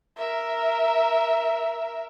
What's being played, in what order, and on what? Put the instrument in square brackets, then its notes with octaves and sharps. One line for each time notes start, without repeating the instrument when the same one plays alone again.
[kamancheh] A#4 E5